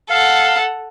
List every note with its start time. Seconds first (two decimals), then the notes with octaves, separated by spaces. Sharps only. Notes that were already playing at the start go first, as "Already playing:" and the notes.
0.10 A4 F5 F#5